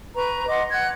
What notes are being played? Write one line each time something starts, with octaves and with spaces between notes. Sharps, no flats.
B4 A#5 C#6
D#5 F#5 C6 D6
F#5 F#6 G#6